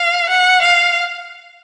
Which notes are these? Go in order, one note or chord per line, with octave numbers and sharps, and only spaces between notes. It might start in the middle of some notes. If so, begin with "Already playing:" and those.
Already playing: F5
F#5
F5